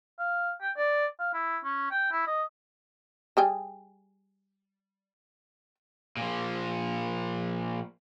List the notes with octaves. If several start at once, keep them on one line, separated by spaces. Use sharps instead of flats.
F5
G5
D5
F5
E4
C#4
G5
E4
D#5
G3 G#4 G5
A#2 F3